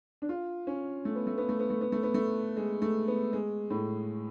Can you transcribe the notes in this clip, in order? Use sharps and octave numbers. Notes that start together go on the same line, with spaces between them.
D4
F4
C#4
A3
B3
A3
B3
A3
B3
A3
B3
A3
B3
A3
G#3
A3
B3
G#3
A2